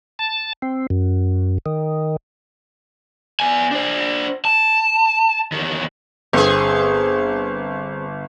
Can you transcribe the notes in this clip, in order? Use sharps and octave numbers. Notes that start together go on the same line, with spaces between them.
A5
C4
F#2
D#3
B3 G#5
D4 C5
A5
E2 D#3
G1 C4 G#4